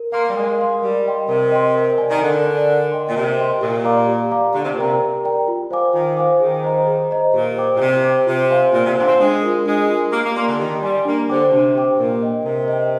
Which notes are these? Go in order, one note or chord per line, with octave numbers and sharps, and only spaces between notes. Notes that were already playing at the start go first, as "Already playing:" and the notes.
Already playing: A#4
A#3 F5 C6
G3
G#3 A#4
F5 C6
G3 A#4
D#5 G5 C6
C3 A#4
D#5 G5 C6
A#4
D5 G#5
D#3
D3 A#4
D5 G#5
A#4
D#5 G5 C6
A#2
C3 A#4
D#5 G5 C6
A#2 G4
D5 F5 A#5 D6
G4
D5 F5 A#5 D6
D3 G4
C3
A#2
C3 A#4 D5 G5 A#5
G4
A#4 D5 G5 A#5
F4
C5 F5 G#5 D6
D#3 F4
C5 F5 G#5 D6
D#3 G#4
C5 D#5 A#5
G#4
C5 D#5 A#5
A#2 G4
C5 G5 D6
A#2
C3 G4
C5 G5 D6
C3 F4
C5 F5 G#5 C6
A#2 F4
C3
D3 C5 F5 G#5 C6
C4
G#3 D4
F4 A#4
G#3 D4
F4 A#4
A#3 G4
A#3
A#3 D5 G#5 C6
D3
D#3 G4
G3 D5 G#5 C6
A#3 D4
D3 G4 C5 G5 D6
C3 D4
G4 C5 G5 D6
A#2 A#4
D#5 G5
C3 A#4
D#5 G5